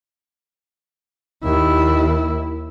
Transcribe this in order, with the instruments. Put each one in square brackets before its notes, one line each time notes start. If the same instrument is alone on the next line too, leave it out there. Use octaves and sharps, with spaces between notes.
[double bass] D#2 E4